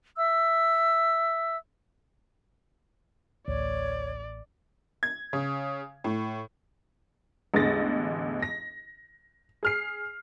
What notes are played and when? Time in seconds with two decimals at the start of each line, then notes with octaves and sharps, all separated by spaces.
0.16 E5 E6
3.48 A1 D2 C#5 D5
5.03 G#6
5.33 C#3
6.04 A2
7.54 A1 E2 D3 G#3 A6 A#6
8.42 A#6
9.63 G#4 F6 C7